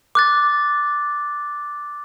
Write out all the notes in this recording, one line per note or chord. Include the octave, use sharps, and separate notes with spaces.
D6 F#6 A6